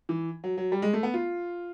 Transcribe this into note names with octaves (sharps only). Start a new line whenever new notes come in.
E3
F#3
F#3
G3
G#3
A3
B3
F4